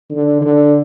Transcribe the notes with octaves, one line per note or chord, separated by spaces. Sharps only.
D3
D3